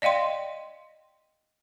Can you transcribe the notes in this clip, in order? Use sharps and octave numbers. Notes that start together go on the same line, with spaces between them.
D5 D#5 F5 G5 C6